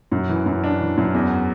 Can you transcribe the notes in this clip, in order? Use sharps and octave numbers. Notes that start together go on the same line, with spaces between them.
F#2
E3
F#2
D4
E3
F#2
E2